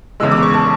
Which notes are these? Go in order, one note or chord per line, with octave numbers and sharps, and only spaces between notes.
E2 C#3 E3 G#3 E6
D6
C#6
A5